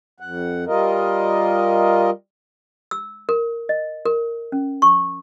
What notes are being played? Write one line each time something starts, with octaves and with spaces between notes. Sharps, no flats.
F2 F#5
G3 F4 A#4 D#5
E6
A#4
D#5
A#4
C#4
C#6